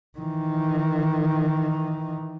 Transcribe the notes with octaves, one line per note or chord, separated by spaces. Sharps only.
D#3 E3